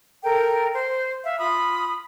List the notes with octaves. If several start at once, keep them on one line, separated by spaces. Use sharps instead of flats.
A4 A#4 G5
C5
E5 F5
F4 B5 D#6